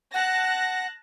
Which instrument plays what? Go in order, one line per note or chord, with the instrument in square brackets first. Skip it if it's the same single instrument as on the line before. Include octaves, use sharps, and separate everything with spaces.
[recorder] F#5 [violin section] A5 F#6 A#6